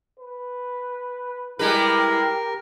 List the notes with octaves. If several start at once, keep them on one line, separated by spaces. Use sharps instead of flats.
B4
G3 G#3 E4 G4 A#4 B4